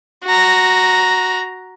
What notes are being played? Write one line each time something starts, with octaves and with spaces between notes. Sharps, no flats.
F#4 A#5